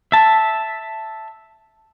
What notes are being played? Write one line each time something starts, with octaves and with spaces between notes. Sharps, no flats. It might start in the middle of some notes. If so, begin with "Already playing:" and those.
E5 A5